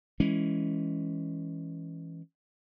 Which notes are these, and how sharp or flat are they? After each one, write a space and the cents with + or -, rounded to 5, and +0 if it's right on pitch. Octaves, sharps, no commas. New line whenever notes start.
E3 +0 G#3 +0 C#4 +0